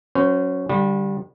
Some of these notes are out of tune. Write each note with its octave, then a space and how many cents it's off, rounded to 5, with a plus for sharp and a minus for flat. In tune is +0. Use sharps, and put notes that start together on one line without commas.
F#3 +0 C#4 +0 C5 -30
D3 +0 G3 +0 F#4 -45